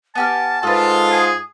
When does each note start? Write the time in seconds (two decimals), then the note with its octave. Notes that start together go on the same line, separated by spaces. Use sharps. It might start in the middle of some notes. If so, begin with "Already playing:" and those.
0.15 B3 G4 G#5 A5 F6
0.63 G#2 F4 A4 B4 D#6
1.11 G#4